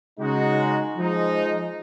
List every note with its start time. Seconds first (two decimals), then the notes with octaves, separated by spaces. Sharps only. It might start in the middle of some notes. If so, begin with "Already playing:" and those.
0.19 C#3 G#3 D#4 F#4
0.97 F3 G#3 D#4